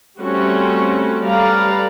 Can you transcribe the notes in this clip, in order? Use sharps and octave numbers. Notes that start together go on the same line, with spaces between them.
G3 A3 C4 C#4 F#4
G3 A4 B4 D5 F5 A#5